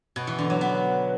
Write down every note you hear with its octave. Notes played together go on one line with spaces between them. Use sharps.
B2
E3
D3
F#3
B3